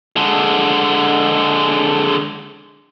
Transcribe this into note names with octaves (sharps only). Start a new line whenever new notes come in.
D3 G#3